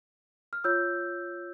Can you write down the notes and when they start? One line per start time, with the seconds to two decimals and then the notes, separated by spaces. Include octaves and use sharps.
0.53 F6
0.64 F4 C#5 E6 G6